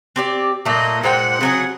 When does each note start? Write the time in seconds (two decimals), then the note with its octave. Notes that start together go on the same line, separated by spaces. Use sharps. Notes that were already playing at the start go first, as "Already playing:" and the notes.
0.16 C4 G4 D5
0.65 A#2 A3 A#3 D#5
1.03 A#2 G#3 C5 F#5 G5
1.41 C#3 F#3 C4 G#4